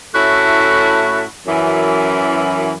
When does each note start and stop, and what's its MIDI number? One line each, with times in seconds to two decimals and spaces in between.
0.15 1.23 45
0.15 1.23 57
0.15 1.23 61
0.15 1.23 64
0.15 1.23 66
1.47 2.73 42
1.47 2.73 52